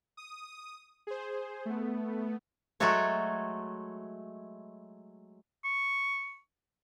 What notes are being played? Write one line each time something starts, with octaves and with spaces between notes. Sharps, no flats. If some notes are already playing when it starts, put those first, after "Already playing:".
D#6
G#4 C5
A3 B3
F#3 G#3 A3 F#4 A4 C#5
C#6